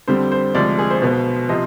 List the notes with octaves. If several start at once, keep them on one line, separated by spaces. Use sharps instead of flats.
F2 D3 G3 C4 C5
C5
D2 C3 F3 G#3 D5
G#4
C5
B1 B2 B3
C3 F3 C4 D#5